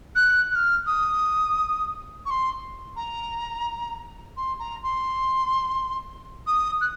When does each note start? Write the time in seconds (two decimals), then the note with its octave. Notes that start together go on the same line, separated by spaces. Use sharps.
0.15 F#6
0.51 F#6
0.55 F6
0.86 D#6
2.25 C#6
2.30 C6
2.96 A#5
4.36 C6
4.59 A#5
4.83 C6
6.46 D#6
6.81 F#6